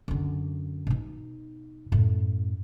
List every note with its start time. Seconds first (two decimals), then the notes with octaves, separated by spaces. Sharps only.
0.08 F#2 D3
0.87 B2 D#4
1.92 F#2 A2